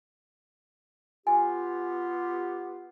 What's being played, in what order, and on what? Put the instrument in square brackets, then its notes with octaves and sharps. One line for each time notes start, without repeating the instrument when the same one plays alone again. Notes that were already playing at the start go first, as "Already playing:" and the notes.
[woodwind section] B3 F4 G4 [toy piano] G#5